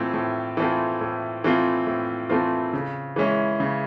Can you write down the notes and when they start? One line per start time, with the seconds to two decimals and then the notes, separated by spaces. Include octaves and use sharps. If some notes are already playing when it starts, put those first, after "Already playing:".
Already playing: A2 E3 A3 C4 F4
0.14 A2
0.57 E3 A3 C4 F4
1.01 A2
1.44 E3 A3 C4 F4
1.87 A2
2.29 E3 A3 C4 F4
2.73 C#3
3.16 E3 G#3 C#4 E4
3.60 C#3